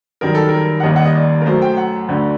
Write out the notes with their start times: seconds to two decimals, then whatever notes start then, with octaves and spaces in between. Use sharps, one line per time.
0.21 F#2 D#3 G3 A#4
0.35 A4
0.49 A#4
0.80 F#5
0.83 D#2 D#3 G3 A#3 D#5
0.96 F#5
1.06 D#5
1.15 D5
1.41 A#4
1.46 F#2 F#3 A3 C5
1.62 G5
1.77 F#5
2.08 D2 D3 A3